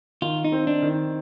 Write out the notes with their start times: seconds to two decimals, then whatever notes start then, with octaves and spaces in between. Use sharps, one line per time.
0.22 D#3 F4
0.45 D#4
0.52 C4
0.67 D4
0.82 D#3